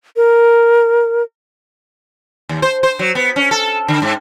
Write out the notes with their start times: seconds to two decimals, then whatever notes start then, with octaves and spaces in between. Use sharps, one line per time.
0.16 A#4
2.49 D#2
2.62 C5
2.83 C5
2.99 F#3
3.15 B3
3.36 C#4
3.51 A4
3.88 D3
4.02 G#2